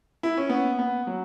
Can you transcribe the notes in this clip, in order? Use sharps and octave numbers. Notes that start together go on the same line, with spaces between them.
E4
C#4
B3
B3
F#3